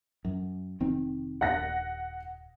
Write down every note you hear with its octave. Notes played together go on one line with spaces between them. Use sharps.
F#2
F1 D#3 C4
D#1 F#5 A#6